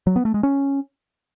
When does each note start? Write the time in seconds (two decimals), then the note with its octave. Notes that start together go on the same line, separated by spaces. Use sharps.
0.07 F#3
0.16 B3
0.25 A3
0.34 G#3
0.43 C#4